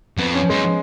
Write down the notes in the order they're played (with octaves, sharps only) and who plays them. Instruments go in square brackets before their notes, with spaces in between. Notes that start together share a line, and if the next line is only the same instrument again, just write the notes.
[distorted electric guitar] F2 [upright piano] B3
[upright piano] C#4
[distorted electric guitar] F#2 [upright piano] G#3